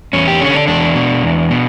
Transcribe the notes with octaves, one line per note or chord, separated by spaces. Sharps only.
E2 C#4
G4
D3 C#4
D4
E2 D4
B2
E2
B2